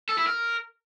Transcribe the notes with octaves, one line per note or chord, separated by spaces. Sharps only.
A4
E4
A#4